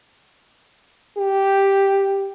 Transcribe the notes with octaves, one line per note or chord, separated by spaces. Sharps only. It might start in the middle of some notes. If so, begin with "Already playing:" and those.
G4